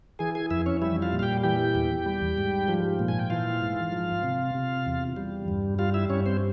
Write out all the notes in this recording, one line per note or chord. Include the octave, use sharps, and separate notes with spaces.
E3 G#4 G#5
G#4 G#5
F2 E4 E5
C#4 C#5
G3 E4 E5
F4 F5
A#2
F5
G4 G5
E3 G4 G5
E2
G3
G#2
F3
A#2
G#5
G5
E3 F4 F5
G#2
F3
C3
C3
E2
G3
G2
G3 F4 F5
E4 E5
G2 C#4 C#5
C4 C5